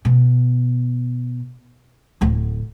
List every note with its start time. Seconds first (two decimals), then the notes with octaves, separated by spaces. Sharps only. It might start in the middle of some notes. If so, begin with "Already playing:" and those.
0.05 B2
2.21 D1 D2